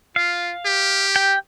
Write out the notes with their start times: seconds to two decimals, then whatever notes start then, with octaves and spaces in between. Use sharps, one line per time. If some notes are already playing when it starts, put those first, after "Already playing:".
0.16 F4 F5
0.66 G4
1.16 G5